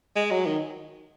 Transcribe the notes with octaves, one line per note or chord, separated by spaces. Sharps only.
G#3
F#3
D#3